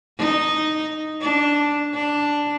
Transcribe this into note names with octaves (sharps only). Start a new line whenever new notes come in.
D#4
D4
D4